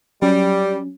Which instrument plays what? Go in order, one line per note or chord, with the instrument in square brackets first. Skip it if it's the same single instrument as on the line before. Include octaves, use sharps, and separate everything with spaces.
[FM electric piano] F#3 C#4 [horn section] G3